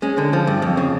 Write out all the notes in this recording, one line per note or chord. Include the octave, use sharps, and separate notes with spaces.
G#3 C#4
D3
F3
G2
F2
C#3